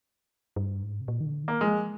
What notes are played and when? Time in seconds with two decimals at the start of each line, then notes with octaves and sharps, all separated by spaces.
0.56 G2
0.83 G#2
1.01 C3
1.08 A#2
1.20 D#3
1.26 D3
1.43 D#3 A#3
1.61 F3 G#3